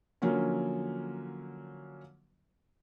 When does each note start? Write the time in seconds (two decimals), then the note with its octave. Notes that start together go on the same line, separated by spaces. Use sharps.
0.22 D3 F3 F#3 A#3 C#4